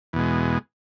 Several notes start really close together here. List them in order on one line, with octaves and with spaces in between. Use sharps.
E2 B2 G#3